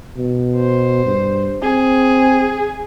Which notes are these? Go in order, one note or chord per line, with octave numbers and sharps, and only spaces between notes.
B2
C5
G2
C4 G#4